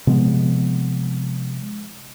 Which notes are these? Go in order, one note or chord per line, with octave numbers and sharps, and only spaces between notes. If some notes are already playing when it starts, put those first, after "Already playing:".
C3 F3 G#3 B3